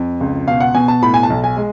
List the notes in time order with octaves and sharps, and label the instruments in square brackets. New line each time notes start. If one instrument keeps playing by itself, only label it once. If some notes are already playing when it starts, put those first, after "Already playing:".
Already playing: [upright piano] F2
C#2
B2 F5
F#5
B2 G#5
A5
A2 B5
G#5
A5
B1
G#5
G#3